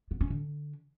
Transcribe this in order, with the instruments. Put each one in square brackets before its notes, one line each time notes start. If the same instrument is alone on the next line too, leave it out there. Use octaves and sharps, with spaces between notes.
[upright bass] B3
C#4
D3